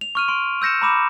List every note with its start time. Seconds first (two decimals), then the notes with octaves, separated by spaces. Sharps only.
0.01 F7
0.15 C#6 F6 D#7
0.28 C6 D7
0.62 E6 G6 A#6 C#7 E7
0.82 A#5 B5 D6 E7